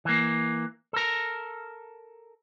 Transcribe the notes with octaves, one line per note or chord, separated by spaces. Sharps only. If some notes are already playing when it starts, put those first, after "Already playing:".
E3 A#3
A4 A#4